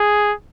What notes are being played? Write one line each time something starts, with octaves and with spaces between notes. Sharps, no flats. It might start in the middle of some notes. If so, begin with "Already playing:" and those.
Already playing: G#4